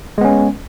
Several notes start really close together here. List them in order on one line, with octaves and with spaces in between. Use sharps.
G#3 B3 C#4